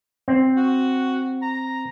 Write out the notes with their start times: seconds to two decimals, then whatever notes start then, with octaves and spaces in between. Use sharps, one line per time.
0.28 C4
0.57 F#4
1.42 A#5